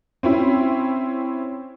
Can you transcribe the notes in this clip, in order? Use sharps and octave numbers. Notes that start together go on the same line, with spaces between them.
C4 C#4 E4